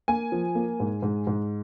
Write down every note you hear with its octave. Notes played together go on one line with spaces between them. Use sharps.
A#3 G#5
F3
A#3
G#2
G#2
G#2